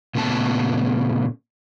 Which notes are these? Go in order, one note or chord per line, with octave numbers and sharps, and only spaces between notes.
A#2 C#3 A3 B3 A5